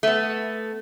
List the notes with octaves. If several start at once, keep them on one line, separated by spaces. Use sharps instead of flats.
A3 B3